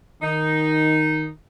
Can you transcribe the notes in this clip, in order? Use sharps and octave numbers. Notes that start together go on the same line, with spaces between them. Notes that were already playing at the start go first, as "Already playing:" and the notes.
D#3 D#4